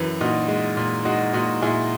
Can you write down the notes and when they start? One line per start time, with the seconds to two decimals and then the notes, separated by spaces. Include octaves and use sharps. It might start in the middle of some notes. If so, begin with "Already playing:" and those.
Already playing: F#2 E3 A#4
0.21 A#2 D#4 F#4
0.48 G#3
0.77 A#2
1.05 G#3 D#4 F#4
1.33 A#2 D#4 F#4
1.62 A#2 E4 G#4